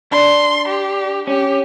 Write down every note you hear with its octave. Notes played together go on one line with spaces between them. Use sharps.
D4 C6
G4
C#4 G4